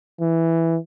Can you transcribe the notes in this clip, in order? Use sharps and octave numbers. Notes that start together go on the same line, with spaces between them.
E3